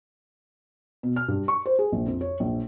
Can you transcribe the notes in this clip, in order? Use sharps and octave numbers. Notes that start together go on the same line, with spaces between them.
B2
F6
G2
C#6
C5
G#4
A#1
F2
C#5
A#1